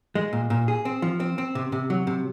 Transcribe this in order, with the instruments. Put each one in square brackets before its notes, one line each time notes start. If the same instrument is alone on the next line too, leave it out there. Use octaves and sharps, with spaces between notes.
[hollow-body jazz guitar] G#3
A#2
A#2
G#4
C4
F3
C4
C4
C3
C3
F#3
C3